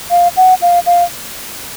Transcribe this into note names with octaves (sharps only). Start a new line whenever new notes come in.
F5
F#5
F5
F5